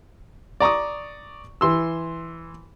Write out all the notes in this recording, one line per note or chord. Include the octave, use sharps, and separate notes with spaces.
D5 A#5 C#6 D#6
E3 C6 E6